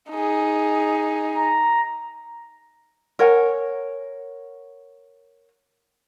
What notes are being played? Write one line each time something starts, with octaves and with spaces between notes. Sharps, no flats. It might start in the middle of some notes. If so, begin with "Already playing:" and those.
D#4 G#4
A#5
A#4 C#5 F#5 G#5